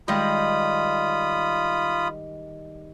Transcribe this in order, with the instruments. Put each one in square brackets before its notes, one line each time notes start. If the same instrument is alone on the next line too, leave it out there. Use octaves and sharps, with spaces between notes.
[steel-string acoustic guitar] D#3 G3 G#3 [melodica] F4 B5 D#6